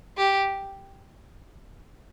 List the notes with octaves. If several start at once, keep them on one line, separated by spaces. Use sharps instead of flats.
G4